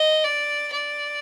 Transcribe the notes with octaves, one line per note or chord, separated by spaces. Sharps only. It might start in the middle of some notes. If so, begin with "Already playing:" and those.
Already playing: D#5
D5
D5